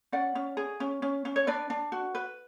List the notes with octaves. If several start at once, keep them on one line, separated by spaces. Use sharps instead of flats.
C#4 D5 F#5
C#4
G#4
C#4
C#4
C#4
C#5
D4 B4 D5
D4
F#4
B4